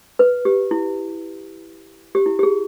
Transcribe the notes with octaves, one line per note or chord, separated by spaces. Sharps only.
B4
G4
E4
G4
E4
G4
G#4